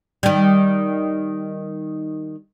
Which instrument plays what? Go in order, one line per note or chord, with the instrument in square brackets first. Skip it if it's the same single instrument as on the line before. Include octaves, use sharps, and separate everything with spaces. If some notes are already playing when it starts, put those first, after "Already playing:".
[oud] D#3 G3